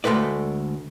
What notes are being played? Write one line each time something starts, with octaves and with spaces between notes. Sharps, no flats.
D2 G#3 A3 B4 D5